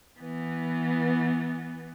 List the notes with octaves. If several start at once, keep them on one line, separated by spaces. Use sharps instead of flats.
E3 B3